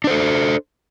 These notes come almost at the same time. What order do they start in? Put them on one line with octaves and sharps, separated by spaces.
D4 C5 A4